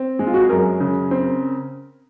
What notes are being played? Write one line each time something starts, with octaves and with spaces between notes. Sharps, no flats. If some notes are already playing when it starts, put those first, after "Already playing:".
Already playing: C4
G#3
F4
F#4
G#4
F#2 A#4
C#3
C4